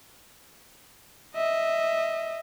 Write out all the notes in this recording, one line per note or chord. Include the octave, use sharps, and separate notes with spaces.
D#5 E5